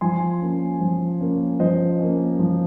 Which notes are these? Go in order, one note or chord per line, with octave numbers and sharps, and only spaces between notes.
F3 G#5 C6
A#3 C#4
F3
A#3 C#4
F3 C5 D#5
A#3 C#4
F3